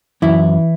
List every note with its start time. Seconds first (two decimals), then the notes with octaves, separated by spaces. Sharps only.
0.22 F#2 E3 E4